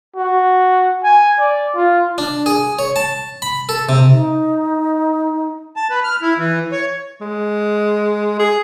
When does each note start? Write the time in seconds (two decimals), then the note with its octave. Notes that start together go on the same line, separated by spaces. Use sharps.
0.16 F#4
1.04 G#5
1.39 D5
1.75 F4
2.18 D4
2.46 G#4
2.79 C#5
2.96 A5
3.42 B5
3.69 A4
3.89 C3
4.12 D#4
5.76 A5
5.90 B4
6.04 F6
6.22 E4
6.38 E3
6.72 C#5
7.21 G#3
8.39 G#4